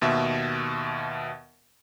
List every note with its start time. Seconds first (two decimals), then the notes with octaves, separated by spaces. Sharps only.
0.01 D#2 B2 E5